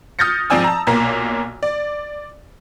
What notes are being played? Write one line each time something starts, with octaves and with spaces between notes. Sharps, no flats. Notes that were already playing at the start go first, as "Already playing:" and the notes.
D#6 F6 G6 A6 A#6 C#7
G#2 F3 C4 D5 G#5 E6
A5 A#5
B1 A#2 A#3 A#5
D5